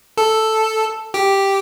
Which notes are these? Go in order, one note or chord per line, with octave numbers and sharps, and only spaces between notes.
A4
G4